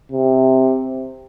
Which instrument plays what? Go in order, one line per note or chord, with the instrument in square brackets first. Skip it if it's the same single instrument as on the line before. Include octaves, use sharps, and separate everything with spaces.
[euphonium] C3